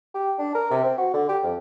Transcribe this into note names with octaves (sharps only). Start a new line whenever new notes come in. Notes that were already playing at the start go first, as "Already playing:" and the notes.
G4
D4
A#4
C3
C4
F#4
D3
G4
F2